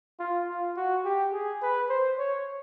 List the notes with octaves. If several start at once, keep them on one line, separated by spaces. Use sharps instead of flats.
F4
F4
F#4
G4
G#4
B4
C5
C#5